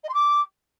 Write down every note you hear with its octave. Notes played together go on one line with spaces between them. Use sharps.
D#5
C6
D6